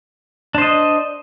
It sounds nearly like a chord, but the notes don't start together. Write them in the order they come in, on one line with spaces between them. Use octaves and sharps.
D4 C5 D#5